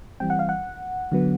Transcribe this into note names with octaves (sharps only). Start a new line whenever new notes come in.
E3 G3 C4 G5
F#5
F5
F#5
D3 F#3 B3